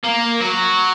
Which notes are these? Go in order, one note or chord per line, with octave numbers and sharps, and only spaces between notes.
A#3
F#3